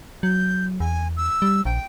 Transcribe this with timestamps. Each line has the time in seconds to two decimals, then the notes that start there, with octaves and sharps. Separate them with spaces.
0.23 F#3 G6
0.80 E2 G#5
1.17 E6
1.42 G3
1.65 A#1 G5